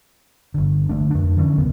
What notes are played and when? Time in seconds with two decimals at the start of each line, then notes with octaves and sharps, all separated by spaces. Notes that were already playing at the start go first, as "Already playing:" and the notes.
0.54 G1 D3
0.89 D3 A3 D4
1.11 F2 D4
1.37 D3 E3 G3 C#4
1.58 G#1 E2 C#3 B3